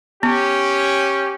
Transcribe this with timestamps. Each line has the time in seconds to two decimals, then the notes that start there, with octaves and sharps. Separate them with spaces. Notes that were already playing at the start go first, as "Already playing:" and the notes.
0.23 B3 C#4 G4